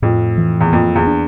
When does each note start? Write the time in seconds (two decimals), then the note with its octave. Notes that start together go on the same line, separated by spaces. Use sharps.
0.02 F2 A2
0.38 E3
0.61 E2
0.72 F2 A#3
0.95 E2
1.07 D4